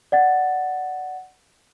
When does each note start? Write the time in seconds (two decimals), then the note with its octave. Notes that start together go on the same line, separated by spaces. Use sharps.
0.12 D5 F#5 A6